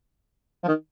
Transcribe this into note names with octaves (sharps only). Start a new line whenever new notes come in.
F3
D#3